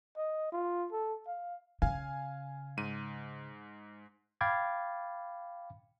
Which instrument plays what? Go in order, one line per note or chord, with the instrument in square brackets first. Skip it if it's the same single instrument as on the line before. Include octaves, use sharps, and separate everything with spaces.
[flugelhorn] D#5
F4
A4
F5
[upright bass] C#3 [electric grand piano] F5 G#5
[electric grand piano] G#2 D#7
[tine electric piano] F5 G5 B5 D6 G#6 A6